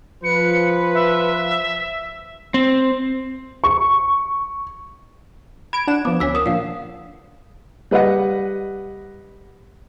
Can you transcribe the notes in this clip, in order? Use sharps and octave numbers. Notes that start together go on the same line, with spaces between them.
F3 B4 C#7
E5
C4
C#6
B5 G#6 D7
D4 F#5 E7
F3 B3 D6
D2 C#4 E6 B6
A#4 D#6 E7
A#2 D3 F3 F5 F#5
G3 B4 D#5 F#5